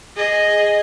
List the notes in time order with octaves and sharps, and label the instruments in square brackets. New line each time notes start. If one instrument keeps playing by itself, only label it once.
[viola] G#4 D#5